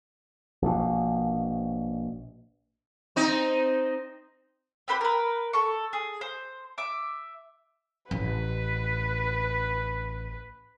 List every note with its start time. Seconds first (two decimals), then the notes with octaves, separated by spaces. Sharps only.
0.62 A#1 B2
3.16 C4 D#4
4.88 C4 G4 B4 C5
5.01 A#4 B4
5.53 A4 C#6
5.93 G#4
6.21 C5
6.78 E5 D6
8.11 A1 B4